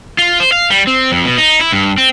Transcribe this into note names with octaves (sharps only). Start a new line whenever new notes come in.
F4
C5
F5
G3
C4
F2
B2
D#4
E4
G2
C4